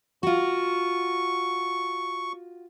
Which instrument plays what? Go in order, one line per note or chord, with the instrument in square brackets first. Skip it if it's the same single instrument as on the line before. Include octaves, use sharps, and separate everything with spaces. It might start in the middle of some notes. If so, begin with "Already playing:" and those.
[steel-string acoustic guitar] F4 F#4 [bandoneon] C#6